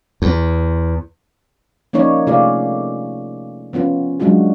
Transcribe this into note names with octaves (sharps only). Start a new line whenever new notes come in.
E2
F3 A#3 C#4 D#4 C#5 D5
C3 A3 F4 G#4 D5 F5
F3 B3 C#4 F4
F#3 G#3 D4 F4 F#4